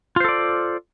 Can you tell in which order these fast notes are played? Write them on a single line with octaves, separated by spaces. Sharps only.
F4 C5 A4 D5